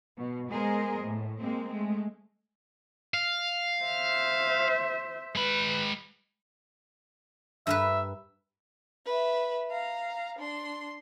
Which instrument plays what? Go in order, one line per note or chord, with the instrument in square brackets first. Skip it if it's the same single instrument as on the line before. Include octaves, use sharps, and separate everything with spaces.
[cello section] B2
G#3 B3 G#4 A#4 C5 D#5
A2
G#3 A#3 C4
G#3 A3
[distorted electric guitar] F5
[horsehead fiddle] C5 E5
[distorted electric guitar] G#3 B5 [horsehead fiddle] B4
[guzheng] G2 A#4 B4 [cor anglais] E5
[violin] B4 E5
F5 A#5
D4 C6